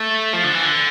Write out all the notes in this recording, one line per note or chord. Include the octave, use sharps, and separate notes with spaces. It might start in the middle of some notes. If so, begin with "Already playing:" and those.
Already playing: A3
F3
D3
E3
D3